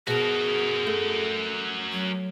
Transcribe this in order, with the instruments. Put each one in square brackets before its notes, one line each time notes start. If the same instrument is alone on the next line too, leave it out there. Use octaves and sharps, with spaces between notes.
[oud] B2 [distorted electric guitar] F#4 A#4 [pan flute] G#4
[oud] A3
[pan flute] F#3